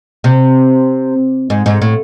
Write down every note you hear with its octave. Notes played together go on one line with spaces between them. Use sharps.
C3
G#2
G#2
A2